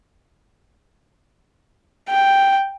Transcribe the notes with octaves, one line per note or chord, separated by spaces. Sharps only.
G5